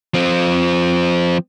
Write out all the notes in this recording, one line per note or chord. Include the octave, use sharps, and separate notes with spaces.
F3 C4